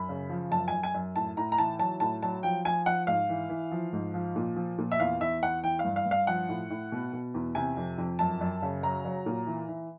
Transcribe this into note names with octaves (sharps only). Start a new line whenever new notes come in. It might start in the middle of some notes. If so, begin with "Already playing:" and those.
Already playing: F#2 B5
C#3
F3
F#2 A5
F#2 G#5
G#5
F#2
A2 A5
A2 A#5
A#5
E3 A5
F#3 A5
A2 A5
F#3 A5
F3 G5
F3 G#5
F3 F#5
G#2 F5
E3
E3
F3
G#2
F3
A#2
F3
A#2
E5
E2 F5
E2 E5
E2 F#5
E3 G5
F5
G2
F5
G2
F5
F3 F#5
A2
A2
B2
B2
E2
C3 G#5
F2
F2
F#2 A5
F#2
C#3
F#3 A#5
F#3
A#2
E3
E3